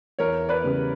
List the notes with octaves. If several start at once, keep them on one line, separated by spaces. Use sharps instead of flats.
E2 A#4 C#5
B4 D5
C#3 G3 B3